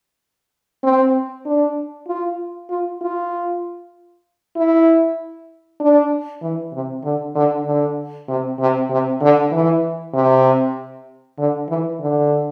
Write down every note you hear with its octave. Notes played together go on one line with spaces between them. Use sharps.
C4
D4
F4
F4
F4
E4
D4
E3
C3
D3
D3
D3
C3
C3
C3
D3
E3
C3
D3
E3
D3